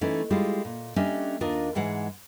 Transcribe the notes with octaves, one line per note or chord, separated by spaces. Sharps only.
E3 A3 C#4 D#4
G3 G#3 E4 F4
A#2
G3 A3 C#4 D4 D#5
D#2 D4 F4 A#4 D#5
G#2 E3 G#3 F#5